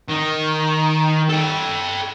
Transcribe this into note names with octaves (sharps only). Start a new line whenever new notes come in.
D#3
A4 G5